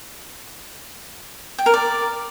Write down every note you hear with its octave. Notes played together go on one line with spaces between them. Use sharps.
G5
A#4
D5